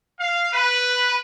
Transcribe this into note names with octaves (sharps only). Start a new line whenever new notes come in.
F5
B4